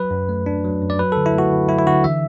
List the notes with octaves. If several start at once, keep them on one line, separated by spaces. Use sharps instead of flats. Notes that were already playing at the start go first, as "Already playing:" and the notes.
Already playing: F#3 B4
F#2
A3
D4
F#3
F#2
D5
F#3 B4
D3 A4
E4
A3 F#4
D3
F#3 E4
E4
D3 F#4
E3 E5